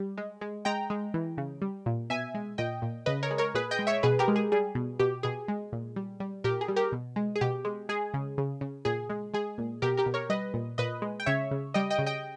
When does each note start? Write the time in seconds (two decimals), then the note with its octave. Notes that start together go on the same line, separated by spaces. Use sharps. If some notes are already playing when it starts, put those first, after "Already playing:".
Already playing: G3
0.17 G#3
0.41 G#3
0.65 G#3 G5 A#5
0.90 G#3
1.14 E3
1.38 C#3
1.62 G3
1.86 A#2
2.10 B2 E5 G#5
2.34 G#3
2.58 A#2 D#5 G5
2.82 A#2
3.06 C#3 B4 D#5
3.23 A#4 C#5
3.31 G#3
3.38 A#4 C#5
3.54 A#2 G#4 B4
3.71 D#5 G5
3.79 G#3
3.87 C#5 E5
4.03 B2 G#4 B4
4.19 G4 A#4
4.28 G#3
4.36 G#4
4.52 G3 G#4
4.75 B2
4.99 B2 G4
5.23 B2 G#4
5.48 G#3
5.72 A#2
5.96 G3
6.20 G3
6.44 A#2 G4 A#4
6.61 G#4
6.68 G3
6.76 G4 A#4
6.92 B2
7.16 G#3
7.36 G#4
7.41 B2 G4
7.65 G#3
7.89 G#3 G#4
8.14 C#3
8.38 C#3
8.61 C#3
8.85 A#2 G#4
9.10 G#3
9.34 G#3 G#4
9.58 A#2
9.82 B2 G4 A#4
9.97 G4 A#4
10.06 B2
10.14 A#4 C#5
10.30 G3 B4 D#5
10.54 A#2
10.78 A#2 B4 D#5
11.02 G#3
11.20 G5
11.26 C#3 C#5 E5
11.51 C#3
11.74 G3 D#5 G5
11.90 D#5 G5
11.99 C#3
12.06 D#5 G5